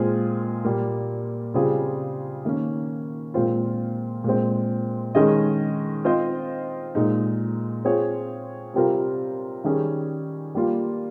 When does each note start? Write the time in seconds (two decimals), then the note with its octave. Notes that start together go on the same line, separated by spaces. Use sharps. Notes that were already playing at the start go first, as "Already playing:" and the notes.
Already playing: A#2 G#3 C4 F4 G#4
0.65 A#2 G3 A#3
1.54 C#3 G3 C4 F4 G#4
2.45 D#3 A#3 C#4
3.34 A#2 G#3 C4 F4
4.24 A#2 G#3 C4
5.15 D#3 G#3 C#4 G#4 D#5
6.05 C4 F4 C5 D#5
6.95 A#2 G#3 D#4
7.85 C4 F4 G#4 C#5
8.74 C3 G3 C4 F4 A#4
9.64 D#3 G3 C#4 G#4
10.55 G3 A#3 F4